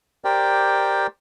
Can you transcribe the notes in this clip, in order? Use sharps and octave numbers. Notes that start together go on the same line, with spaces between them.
G4 A#4 C5 D5 G5